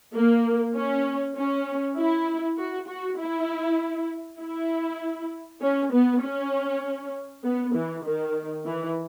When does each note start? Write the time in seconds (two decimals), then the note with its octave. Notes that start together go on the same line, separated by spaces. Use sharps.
0.14 A#3
0.75 C#4
1.36 C#4
1.97 E4
2.57 F#4
2.88 F#4
3.19 E4
4.40 E4
5.62 C#4
5.92 B3
6.23 C#4
7.44 B3
7.74 E3
8.05 D#3
8.65 E3